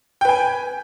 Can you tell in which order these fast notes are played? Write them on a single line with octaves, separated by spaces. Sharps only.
G5 B4 G#5